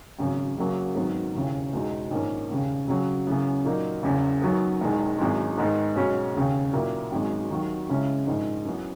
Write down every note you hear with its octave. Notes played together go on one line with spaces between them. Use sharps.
G#1 F#2 C#3
F#1 F#2 C#3 F#3 A#3
G#1 G#2 D#3 F#3 B3
E1 D#2 C#3 E3
E1 E2 B2 G#3 D#4
A#1 G#2 D#3 A#3 C#4
E1 D#2 C#3
F#2 C#3 F#3
F#2 C#3 E3 B3
A#2 F#3 A#3 D#4
F#1 E2 C#3
F#2 D#3 F#3 B3
E1 E2 D#3 G#3
G#1 F#2 E3 G#3
G#2 D#3 G#3 B3 D#4
B1 B2 G#3 C#4 F#4
E1 D#2 C#3
B1 A#2 A#3 E4
G#1 F#2 D#3 G#3
D#2 D#3 F#3
C#2 C#3 G#3 C#4 E4
A#1 G#2 D#3 G#3
F#2 E3 B3